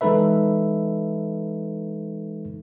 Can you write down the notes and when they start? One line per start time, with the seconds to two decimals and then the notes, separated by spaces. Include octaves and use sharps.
0.01 E3 G#3 D#4 A4 B4 E5